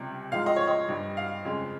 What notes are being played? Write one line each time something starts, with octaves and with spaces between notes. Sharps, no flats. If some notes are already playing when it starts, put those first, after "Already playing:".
Already playing: C#2 C3 G3
G#2 F3 G#3 F5
D#5
C#5
D#5
G2 G3
F5
F2 C#3 G#3